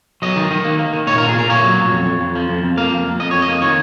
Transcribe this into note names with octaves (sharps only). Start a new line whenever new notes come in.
F#3 D#5
D#3
D#3
A#3
A#3
D#3
A#2 C#5
A#4
A#2
G#4
A#2 A#4
A#3 C#5
F#3
A#2
F2
F2
F2
F3
F2
F2
A#3 F5
F2
F2
F2 D#5
F2 C#5
D#5
A#3
D#3 C#5